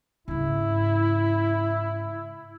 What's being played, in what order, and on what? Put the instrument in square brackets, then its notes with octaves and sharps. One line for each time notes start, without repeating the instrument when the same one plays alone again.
[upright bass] G#2 C#3 [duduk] E4